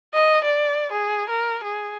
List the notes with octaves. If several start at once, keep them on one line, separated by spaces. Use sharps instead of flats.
D#5
D5
G#4
A#4
G#4